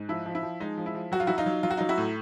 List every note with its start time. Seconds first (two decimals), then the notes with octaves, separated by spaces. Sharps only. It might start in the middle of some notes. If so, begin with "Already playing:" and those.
Already playing: G#2
0.09 F3 E4
0.26 F3
0.35 E4
0.43 F3
0.60 G#3 D#4
0.78 F3
0.86 E4
0.95 F3
1.12 F#3 F#4
1.20 F4
1.27 F#3 E4 F#4
1.38 D#4 F4
1.46 F#3
1.63 F#3 F4
1.71 F#4
1.77 F#3 D#4 F4
1.89 E4 F#4
1.98 A2